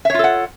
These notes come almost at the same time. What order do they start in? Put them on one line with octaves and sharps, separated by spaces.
E5 C#5 F4 A4 F#5